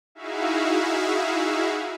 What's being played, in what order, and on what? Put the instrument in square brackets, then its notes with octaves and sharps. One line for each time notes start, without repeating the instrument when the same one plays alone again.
[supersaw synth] D#4 E4 F#4 G#4 E5 F5